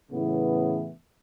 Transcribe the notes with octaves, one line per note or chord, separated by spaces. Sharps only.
A2 C#3 E3 B3